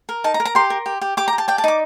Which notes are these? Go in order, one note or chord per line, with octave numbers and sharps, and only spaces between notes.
A#4
D#4 A5
A#5
A#4
A#5
G4 C6
A#4
G4
G4
G4 D6
A#5
G4
A5
D5 G5
A5
D#4 D6